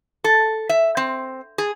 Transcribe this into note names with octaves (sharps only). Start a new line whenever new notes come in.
A4
E5
C4
G#4